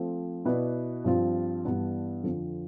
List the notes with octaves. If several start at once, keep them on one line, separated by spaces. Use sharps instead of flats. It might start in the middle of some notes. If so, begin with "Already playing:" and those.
Already playing: F3 A3 C4
B2 B3 E4 B4 D5
G2 F3 C4 F4
G2 E3 B3 D4
F2 D3 F3 C4